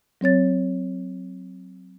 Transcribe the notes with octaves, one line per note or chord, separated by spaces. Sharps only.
F#3 C4 C#5 A6